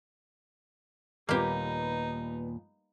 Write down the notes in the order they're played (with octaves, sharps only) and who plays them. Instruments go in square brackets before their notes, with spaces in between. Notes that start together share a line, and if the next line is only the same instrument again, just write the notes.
[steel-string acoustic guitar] D#2 A#2 F4 [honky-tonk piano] G3 B3 [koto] A#3 G4 [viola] D#4